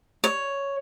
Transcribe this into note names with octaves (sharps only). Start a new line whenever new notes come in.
C#5